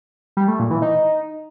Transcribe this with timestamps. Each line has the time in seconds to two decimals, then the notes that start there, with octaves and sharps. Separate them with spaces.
0.37 G3
0.48 A3
0.59 A#2
0.71 E3
0.82 D#4